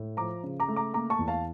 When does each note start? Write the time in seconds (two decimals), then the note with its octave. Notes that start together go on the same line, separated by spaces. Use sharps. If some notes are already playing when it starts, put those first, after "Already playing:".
Already playing: A2
0.17 F3 A#5 D6
0.44 C#3
0.60 A#5 D6
0.68 A3
0.76 A#5 D6
0.93 A#3 A#5 D6
1.10 A5 C#6
1.19 E2
1.28 F5 A5